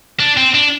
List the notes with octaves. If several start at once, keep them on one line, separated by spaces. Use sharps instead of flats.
D4
C4
D4